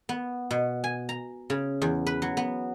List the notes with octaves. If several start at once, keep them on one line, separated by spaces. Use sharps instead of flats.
B3
B2
G#5
A#5
C#3
E2
B4
F#3
B3